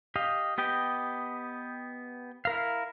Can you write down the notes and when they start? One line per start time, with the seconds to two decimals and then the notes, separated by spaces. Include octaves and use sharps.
0.16 G4 D#5 F5
0.58 B3 G4 D#5 G5
2.45 E4 A#4 F5